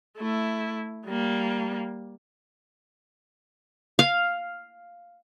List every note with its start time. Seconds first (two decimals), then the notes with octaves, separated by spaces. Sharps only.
0.17 A3 E4
1.07 G3 A#3
3.99 F5